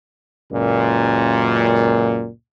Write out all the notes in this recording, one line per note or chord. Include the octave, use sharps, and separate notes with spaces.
C#2 F#2 A#2